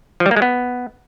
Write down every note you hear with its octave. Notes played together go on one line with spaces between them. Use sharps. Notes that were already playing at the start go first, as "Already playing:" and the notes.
F3
G3
A#3
G#3
B3